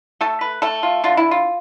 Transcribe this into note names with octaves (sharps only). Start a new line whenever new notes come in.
A3 A4
B4
A3 A4
F4
D3 F4
E4
F4